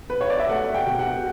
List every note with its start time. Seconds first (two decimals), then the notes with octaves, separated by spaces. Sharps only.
0.10 B4
0.21 C#5
0.30 D5
0.39 E5
0.49 A3 F#5
0.74 G5
0.86 B2
0.99 F#5